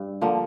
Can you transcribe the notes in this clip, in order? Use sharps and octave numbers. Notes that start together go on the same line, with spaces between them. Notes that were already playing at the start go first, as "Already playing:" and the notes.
Already playing: G2
D3 F3 A#3